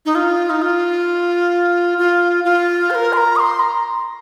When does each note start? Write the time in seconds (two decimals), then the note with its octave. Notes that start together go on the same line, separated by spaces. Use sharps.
0.06 D#4
0.15 F4
0.50 D#4
0.62 F4
1.98 F4
2.44 F4
2.91 C5
2.95 A#4
3.13 C6
3.17 A#5
3.36 D#6
3.40 C6
3.60 A#5